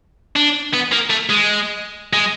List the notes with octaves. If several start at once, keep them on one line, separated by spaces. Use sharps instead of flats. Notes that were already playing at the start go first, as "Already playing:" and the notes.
D4
B3
A#3
A3
G#3
G#3